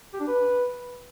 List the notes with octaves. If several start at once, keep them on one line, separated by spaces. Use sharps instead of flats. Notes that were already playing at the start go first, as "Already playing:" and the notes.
G4
D4
B4